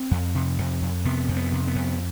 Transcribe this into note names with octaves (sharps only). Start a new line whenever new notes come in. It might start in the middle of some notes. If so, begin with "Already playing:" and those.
Already playing: C4
F2
C3
F2
F2
C3 B3
F2
B3
C3
B3
F2